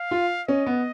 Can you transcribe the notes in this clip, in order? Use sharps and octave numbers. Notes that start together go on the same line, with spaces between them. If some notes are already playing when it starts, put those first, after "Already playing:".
Already playing: F5
F4
C#4 D#5
B3